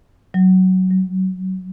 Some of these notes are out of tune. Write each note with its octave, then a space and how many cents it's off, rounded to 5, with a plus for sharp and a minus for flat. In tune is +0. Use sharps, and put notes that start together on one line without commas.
F#3 +10
F#3 +45